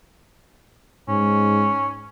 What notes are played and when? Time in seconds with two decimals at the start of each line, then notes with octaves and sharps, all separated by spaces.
1.09 G#2 C#4